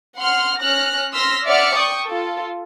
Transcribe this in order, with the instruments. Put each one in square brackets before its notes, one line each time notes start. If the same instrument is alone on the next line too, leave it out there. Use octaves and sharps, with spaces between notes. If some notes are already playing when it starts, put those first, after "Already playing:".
[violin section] F#5 C6 F6
C#4 F6 F#6 A#6
C6 E6 F6 A#6 B6
D5 E5 F#5 F6 C#7
G5 C#6 D#6
F4 A4